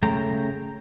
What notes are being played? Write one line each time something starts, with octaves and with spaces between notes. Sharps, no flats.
C#3 A3 G5 A#5